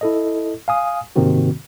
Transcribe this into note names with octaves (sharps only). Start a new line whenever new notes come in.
E4 A4 D#5
F5 G#5 D#6
G#2 C3 D#3 A#3 C4 F#4